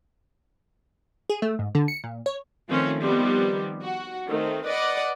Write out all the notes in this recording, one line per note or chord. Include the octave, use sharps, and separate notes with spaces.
G#4
A3
G#2
D3
C#7
A#2
C#5
D#3 F3 A3 C4 C#4
D#3 F3 G3 B3 C4
F#4
D#3 A3 C4
B4 D5 D#5 F#5